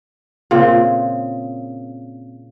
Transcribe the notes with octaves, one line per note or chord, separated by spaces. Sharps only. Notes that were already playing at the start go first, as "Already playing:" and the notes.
A#2 C#3 C4